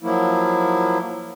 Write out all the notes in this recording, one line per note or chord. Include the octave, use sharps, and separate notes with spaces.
F3 F#3 A#3 E4